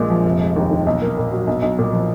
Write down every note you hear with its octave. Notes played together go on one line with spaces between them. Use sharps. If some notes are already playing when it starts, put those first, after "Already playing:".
Already playing: A#1 A#2 G#3
F3
F1
G#3
D#2
D#3
B1
A#3
A#2
F#3
B1
B1
A#2
F3